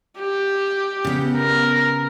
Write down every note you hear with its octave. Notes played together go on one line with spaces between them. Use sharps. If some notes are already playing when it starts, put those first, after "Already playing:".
G4
C#3 B3
A#4